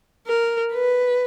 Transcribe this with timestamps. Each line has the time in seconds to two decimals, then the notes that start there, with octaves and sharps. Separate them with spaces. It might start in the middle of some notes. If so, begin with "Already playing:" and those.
0.27 A#4
0.73 B4